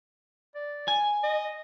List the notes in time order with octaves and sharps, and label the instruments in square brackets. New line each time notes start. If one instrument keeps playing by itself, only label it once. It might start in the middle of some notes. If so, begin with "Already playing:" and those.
[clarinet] D5
[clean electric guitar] G#5
[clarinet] D#5